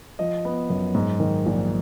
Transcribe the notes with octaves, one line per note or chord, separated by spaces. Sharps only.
F3 D#5
B3
F#2
G#2
D#3
A#1